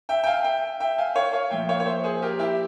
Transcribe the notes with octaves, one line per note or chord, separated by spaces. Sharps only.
E5 G5
G5
F5 G#5
E5 G5
E5 G5
F5 G#5
C#5 F5
C#5 F5
A#2 F3 E5 G5
C#5 F5
C#5
C5 E5
G#4 C5
G4 A#4
E4 G4